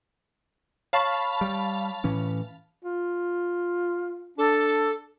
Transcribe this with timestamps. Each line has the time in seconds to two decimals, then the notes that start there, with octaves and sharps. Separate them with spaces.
0.93 C#5 F5 A5 B5 C#6
1.41 G3
2.04 A2 E3 C#4
2.84 F4
4.38 D4 A4